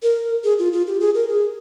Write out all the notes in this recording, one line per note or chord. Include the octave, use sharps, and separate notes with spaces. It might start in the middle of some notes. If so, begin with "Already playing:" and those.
A#4
G#4
F4
F4
G4
G#4
A#4
G#4